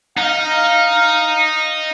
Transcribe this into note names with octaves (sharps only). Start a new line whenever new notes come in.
D#4 F5